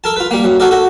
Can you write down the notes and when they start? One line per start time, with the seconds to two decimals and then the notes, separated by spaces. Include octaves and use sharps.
0.04 A4 A#4 A5
0.16 F4 B4
0.31 G3 A#3
0.44 F#2
0.60 F#4 A4 A#4 D5
0.71 F#4 A4